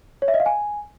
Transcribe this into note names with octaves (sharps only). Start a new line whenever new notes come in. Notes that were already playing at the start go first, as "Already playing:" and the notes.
C#5
E5
D#5
F5
G#5